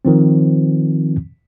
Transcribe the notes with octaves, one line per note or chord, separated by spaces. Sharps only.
D#3 F3 C4